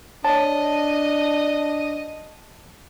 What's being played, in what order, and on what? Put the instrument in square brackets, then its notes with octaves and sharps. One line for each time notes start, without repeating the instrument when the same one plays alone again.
[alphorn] D4 [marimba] C#5 [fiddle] D#5 [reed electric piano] A5